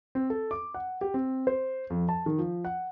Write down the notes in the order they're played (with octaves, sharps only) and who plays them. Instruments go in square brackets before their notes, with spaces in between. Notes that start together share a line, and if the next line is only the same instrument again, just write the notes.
[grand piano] C4
A4
D6
F#5
G4
C4
C5
F2
A5
D#3
F3
F#5